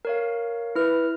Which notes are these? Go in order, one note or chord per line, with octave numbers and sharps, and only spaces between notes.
A#4 C#5 F5
E4 B4 F6